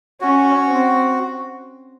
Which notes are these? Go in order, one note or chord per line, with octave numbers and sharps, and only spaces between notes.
C#4 F#4
C4